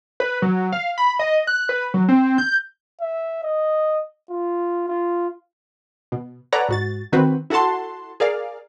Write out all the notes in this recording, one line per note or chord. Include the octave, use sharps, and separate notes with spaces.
B4
F#3
F5
B5
D#5
F#6
B4
F#3
C4
G6
E5
D#5
F4
F4
B2
A4 B4 C#5 D5 F#5 A#5
G#2 F#4 A6
D#3 C4 F#4 B4
E4 F#4 A4 F#5 A5 C6
G#4 A#4 D5 F5